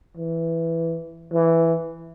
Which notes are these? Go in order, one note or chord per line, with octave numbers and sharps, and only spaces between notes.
E3
E3